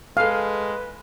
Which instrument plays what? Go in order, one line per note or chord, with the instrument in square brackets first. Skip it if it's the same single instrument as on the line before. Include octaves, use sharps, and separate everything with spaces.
[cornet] G#3 [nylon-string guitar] G#4 A4 [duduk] B4 [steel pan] F5